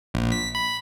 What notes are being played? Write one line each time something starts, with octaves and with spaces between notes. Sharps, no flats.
A#1
B6
B5